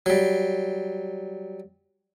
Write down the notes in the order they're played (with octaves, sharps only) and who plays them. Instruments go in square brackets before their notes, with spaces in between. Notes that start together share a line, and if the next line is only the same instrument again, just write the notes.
[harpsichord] F#3 G3